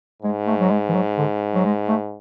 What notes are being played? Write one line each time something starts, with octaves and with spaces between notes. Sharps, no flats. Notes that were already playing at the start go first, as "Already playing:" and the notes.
G#2 G#3
A3
F#3
G#3
E3
F#3
D3
F#3
G#3
A3